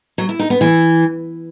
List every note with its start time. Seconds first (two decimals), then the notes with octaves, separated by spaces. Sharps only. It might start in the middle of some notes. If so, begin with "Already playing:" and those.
0.18 F#3
0.29 E4
0.40 D#4
0.50 B3
0.61 E3